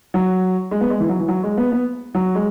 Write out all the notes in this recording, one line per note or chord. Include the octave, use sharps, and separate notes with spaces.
F#3
G#3
B3
G#3
E3
F#3
E3
F#3
G#3
B3
B3
F#3
G#3